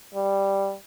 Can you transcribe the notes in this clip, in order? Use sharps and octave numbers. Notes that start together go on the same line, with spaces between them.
G3